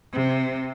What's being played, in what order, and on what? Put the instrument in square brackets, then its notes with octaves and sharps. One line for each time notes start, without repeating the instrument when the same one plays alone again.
[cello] C3